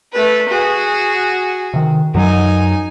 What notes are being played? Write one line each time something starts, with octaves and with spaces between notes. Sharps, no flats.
A3 B4
F#4 G#4
C3 D#3
F#2 F#3 D#4 G#5